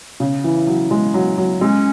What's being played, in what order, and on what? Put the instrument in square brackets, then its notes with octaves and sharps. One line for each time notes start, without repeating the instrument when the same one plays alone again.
[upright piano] C#3
E3
F#3
G#3
F#3
F#3
[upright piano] G#3 [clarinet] C#4